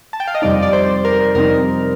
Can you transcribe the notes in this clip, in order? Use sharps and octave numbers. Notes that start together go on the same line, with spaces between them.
A5
G5
F5
D#5
F2 C3 G3 C4 D#4 D5
D5
C5
A#4
F2 C3 G3 C4 D#4 A#4